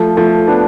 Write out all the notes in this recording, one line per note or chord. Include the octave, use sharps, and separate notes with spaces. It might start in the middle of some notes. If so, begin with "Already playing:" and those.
Already playing: F3 A3
F3 A3
B3 D4